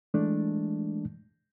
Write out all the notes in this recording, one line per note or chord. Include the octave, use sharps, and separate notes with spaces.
E3 G#3 A3 D4